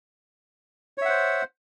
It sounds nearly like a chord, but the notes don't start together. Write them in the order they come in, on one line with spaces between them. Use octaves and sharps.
C#5 E5 F#5 C5